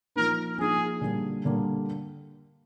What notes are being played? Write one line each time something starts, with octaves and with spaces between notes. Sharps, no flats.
F3 A#3 D#4 A#4
F3 A#3 D#4 G#4
D3 G3 A#3
D3 G3 A#3